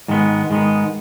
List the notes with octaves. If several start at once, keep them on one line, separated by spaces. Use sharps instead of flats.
G#2 D#3 G#3 B3
G#2 D#3 G#3 B3